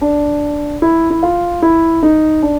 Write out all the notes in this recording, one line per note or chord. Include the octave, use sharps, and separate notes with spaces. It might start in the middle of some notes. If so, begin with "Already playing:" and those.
D4
E4
E4
F4
E4
D#4
D4